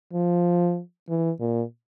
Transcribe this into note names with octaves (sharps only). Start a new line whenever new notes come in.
F3
E3
A#2